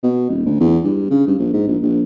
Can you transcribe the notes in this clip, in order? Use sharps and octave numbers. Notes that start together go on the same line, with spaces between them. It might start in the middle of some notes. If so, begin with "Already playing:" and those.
B2
D#1
D2
E2
G2
C#3
G2
A#1
G#2
A#1
A#1